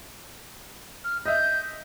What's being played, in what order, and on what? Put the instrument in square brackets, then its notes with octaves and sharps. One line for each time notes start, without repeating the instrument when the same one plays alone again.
[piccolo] F6
[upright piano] D#5 E5 [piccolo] G6